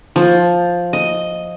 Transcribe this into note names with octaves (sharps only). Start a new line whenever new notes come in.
F3
D#5